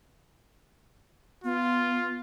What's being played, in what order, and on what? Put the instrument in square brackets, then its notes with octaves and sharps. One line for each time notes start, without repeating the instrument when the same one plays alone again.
[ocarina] B3 [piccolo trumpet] F4